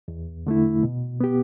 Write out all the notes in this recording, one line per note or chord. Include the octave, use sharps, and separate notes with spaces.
E2
D3 A3 E4
B2
B3 G4